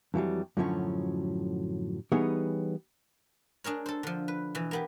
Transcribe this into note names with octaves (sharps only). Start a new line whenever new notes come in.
F2 E3 F#3 G3
F#2 A2 D3 F3 F#3 C#4
E3 G3 B3 D#4 G#4 C#5
D4 G#4 A#4 C#5
A4 C5
D3 F3
B4
B2 E3
A#3 B3 G4